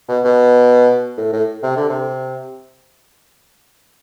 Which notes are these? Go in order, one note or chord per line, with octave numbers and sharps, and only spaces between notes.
B2
B2
A2
A2
C3
D3
C3